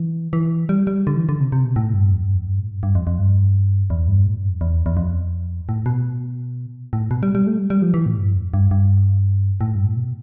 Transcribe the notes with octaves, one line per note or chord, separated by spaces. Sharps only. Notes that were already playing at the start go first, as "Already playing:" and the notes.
Already playing: E3
E3
G3
G3
D3
E3
D3
C3
C3
B2
A2
G2
F2
G2
F2
G2
A2
G2
G2
F2
F2
G2
E2
G2
A2
G2
F2
E2
E2
F2
A2
B2
A2
B2
G3
G3
A3
G3
G3
F3
E3
A2
G2
F2
G2
G2
A2
G2
A2
B2